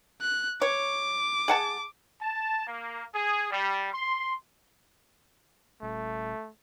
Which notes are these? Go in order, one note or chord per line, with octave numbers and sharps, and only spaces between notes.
F#6
C#5 D6
G#4 F#5 A5
A5
A#3
G#4
G3
C6
D#1 A3